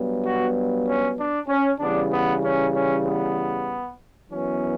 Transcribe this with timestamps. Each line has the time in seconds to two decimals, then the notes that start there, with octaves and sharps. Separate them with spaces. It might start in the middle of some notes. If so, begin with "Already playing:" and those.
Already playing: G2 F#3 B3
0.23 F#4
0.86 C#4
1.17 D4
1.48 C#4
1.79 C#3 E3 G3 B3 D4
2.10 B3
2.43 C#4
2.73 C#4
3.04 B3
4.29 F#2 E3 B3 C#4